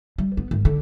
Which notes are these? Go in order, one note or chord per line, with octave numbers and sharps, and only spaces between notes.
G3
B3
G#1
D3